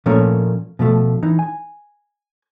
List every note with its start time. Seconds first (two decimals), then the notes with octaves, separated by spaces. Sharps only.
0.06 A#2 F3 A3 A#3 C#4
0.79 B2 F3 A3
1.23 E3 D#4
1.39 G#5